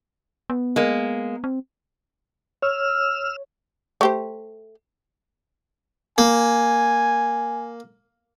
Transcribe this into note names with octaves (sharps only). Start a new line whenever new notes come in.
B3
G#3 A#3
C4
C#5 E6 F6
A3 G4 C5
A#3 G#5